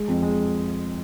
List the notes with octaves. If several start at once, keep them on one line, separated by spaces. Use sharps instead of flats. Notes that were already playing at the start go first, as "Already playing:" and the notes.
Already playing: G#3
F2
G#3